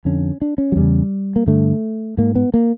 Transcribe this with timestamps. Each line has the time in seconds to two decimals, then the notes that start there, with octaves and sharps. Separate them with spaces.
0.05 F2 D3 C#4
0.41 D4
0.58 C#4
0.72 F#3
0.76 E2 C#3 G3
1.36 A#3
1.47 G2 D3 A3
2.17 G#2 A#3
2.35 B3
2.54 A#3